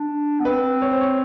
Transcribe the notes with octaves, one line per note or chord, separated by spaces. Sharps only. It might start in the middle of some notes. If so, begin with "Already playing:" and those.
Already playing: D4
B3
C4 B4
C#5
C5
C#5